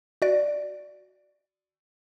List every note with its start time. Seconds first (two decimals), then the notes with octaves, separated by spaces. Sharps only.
0.22 F#4 D5